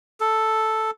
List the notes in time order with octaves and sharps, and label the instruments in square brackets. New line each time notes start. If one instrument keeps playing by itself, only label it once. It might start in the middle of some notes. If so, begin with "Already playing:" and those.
[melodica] A4